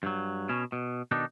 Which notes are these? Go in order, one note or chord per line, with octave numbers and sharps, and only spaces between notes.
G2 F#3
B2 C#4
B2
B2 D#3 D4 D#4